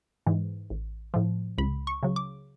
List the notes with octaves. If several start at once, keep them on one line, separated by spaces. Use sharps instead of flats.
G#2 E3
A1
A2 F3
C#2 B5
C#6
C#3 F#3
D6